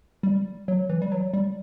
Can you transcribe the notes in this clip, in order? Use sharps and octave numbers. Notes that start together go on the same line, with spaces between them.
G3
F#3
E3
G3
F#3
G3